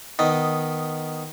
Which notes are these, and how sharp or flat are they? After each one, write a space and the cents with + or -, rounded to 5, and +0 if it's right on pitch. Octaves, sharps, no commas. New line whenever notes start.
D#3 +0 B3 +0 D#5 +0